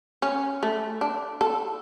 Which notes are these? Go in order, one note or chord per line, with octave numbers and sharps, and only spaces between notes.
C#4
A3
D4
A4